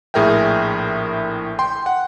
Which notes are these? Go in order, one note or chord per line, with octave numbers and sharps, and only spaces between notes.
A#1 A2 G#4 A#4 E5 G5
G5 C6
F#5